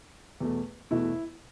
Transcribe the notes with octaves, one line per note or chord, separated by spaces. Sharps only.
E2 B2 A3
E2 B2 A3 E4